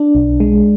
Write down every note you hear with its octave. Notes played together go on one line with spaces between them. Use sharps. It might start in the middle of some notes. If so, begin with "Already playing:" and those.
Already playing: D4
B1
G#3